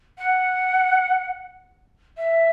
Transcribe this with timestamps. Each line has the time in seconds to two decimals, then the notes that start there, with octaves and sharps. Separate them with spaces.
0.18 F#5
2.17 E5